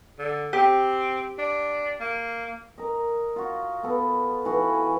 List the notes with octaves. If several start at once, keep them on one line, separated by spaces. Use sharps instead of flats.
D3
C4 G4
D4
A#3
A#4 D#5
F4 F#4
B3 A4
E3 F#4 A4 F5
G#5